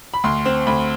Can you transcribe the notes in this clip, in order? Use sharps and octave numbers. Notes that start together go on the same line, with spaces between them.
B5
D2 C6
C4
D2 B5